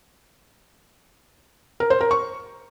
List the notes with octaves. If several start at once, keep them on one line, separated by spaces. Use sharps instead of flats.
A#4
C5
A#4
C#6